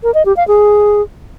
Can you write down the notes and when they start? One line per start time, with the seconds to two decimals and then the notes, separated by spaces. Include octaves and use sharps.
0.03 A#4
0.14 D#5
0.25 G4
0.37 F5
0.48 G#4